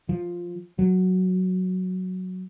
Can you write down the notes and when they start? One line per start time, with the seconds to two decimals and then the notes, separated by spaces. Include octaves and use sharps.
0.09 F3
0.79 F#3